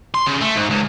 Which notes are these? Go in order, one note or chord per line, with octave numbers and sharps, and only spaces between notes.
C6
C#3
A3
G#2
C#2